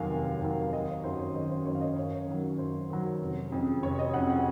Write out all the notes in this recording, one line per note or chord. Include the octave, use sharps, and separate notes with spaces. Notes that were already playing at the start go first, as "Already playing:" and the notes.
Already playing: F1 D#2 D#3 F#3 A#3 F5 G#5
F1
D#2 D#3 F#3 A#3
F5
G#1 D#5
C#5
F#2 D#3 F#3 A#3 C5
C#5
G#1 D#5
C5
F#2 D#3 F#3 A#3 C#5
F5
D#5
F#2 C#5
D#3 F#3
F#2 C5
D#3 F#3
F1
F2 C#3
F1 C#5
D#5
F2 C#3 F#5
F#5